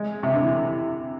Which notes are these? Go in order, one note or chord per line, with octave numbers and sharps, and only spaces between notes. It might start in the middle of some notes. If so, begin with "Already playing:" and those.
Already playing: G#3
C3
D3
E3